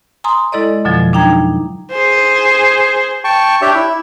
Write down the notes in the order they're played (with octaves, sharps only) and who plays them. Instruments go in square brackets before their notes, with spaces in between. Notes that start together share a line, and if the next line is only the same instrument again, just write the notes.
[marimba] G#5 A#5 C6 D#6
G#3 E4 A4 D5 D#5
F2 B2 D3 F3 F#3
D4 D#4 G5 A#5 G#6
[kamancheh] G#4 C5
[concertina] G5 A5 C#6
D4 G4 C#5 E5 G5
E4